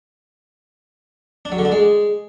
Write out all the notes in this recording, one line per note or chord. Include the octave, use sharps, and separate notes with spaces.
D4
F#3
D3
D4
G#3